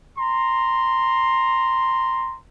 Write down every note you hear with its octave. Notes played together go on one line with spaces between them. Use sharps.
A#5 C6